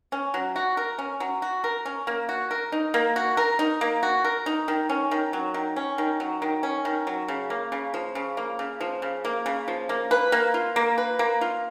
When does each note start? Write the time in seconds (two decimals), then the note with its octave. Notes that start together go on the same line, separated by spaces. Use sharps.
0.12 C#4
0.34 F#3
0.56 F#4
0.77 A#4
0.99 C#4
1.20 F#3
1.42 F#4
1.64 A#4
1.86 C#4
2.07 A#3
2.29 F#4
2.51 A#4
2.72 D#4
2.94 A#3
3.16 F#4
3.37 A#4
3.59 D#4
3.81 A#3
4.03 F#4
4.24 A#4
4.46 D#4
4.68 D#3
4.89 C#4
5.11 D#3
5.33 F#3
5.54 D#3
5.76 C#4
5.98 D#3
6.20 F#3
6.42 D#3
6.63 C#4
6.85 D#3
7.07 F#3
7.28 C#3
7.50 A#3
7.72 C#3
7.94 F3
8.15 C#3
8.37 A#3
8.59 C#3
8.81 F3
9.02 C#3
9.25 A#3
9.46 C#3
9.68 F3
9.89 A#3
10.11 B4
10.32 A#3
10.54 F4
10.76 A#3
10.98 B4
11.19 A#3
11.41 F4